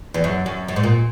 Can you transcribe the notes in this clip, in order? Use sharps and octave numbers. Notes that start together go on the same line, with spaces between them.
E2
F#2
F#2
F#2
G#2
A#2